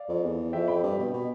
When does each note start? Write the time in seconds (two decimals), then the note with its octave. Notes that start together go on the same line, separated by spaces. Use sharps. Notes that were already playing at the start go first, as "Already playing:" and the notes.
Already playing: D5 F5
0.09 F2
0.23 E2
0.53 F2 E5 G5
0.68 G5 B5
0.83 G2
0.99 B2
1.14 B2